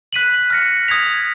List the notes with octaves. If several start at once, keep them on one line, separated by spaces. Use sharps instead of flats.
F#6 B6 D#7 F#7
F6 A#6 C#7
D#6 G#6 B6 F7